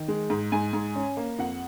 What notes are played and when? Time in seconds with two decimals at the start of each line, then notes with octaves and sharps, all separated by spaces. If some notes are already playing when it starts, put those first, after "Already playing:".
Already playing: D#3
0.08 G#3
0.30 G#2
0.52 G#2 G#5
0.73 G#2
0.96 C#4
1.17 A#3
1.39 F2 F#5